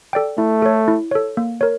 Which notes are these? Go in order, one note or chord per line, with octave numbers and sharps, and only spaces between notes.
A4 D5 G5
A3 E4
A4 C#5
E4
A4 C#5
A#3
A#4 C#5